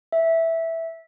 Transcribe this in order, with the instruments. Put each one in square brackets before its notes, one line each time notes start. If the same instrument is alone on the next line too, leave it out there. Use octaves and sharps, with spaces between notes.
[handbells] E5